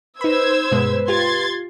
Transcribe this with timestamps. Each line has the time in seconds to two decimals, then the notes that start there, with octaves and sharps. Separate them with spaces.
0.21 D#4 B4 C5 B5 E6 G#6
0.72 G2 B2 G#3 B4
1.08 F4 G4 C6 G#6 A6